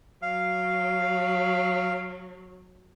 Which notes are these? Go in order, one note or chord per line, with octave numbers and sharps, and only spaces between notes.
F#3 F5